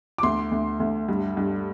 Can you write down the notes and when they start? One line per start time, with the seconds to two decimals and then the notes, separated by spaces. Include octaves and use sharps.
0.18 D6
0.23 D2 C6
0.52 D2
0.80 D2
1.09 G2
1.37 G2